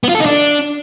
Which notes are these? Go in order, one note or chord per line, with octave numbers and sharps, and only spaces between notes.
B3
F4
A4
D#4
D4